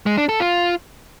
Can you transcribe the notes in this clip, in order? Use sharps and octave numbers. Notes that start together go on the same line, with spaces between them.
G#3
D4
A4
F4